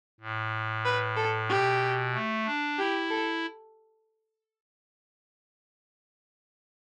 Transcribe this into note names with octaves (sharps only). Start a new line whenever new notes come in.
A2
B4
A4
B2 G4
A3
D4
E4 G4
A4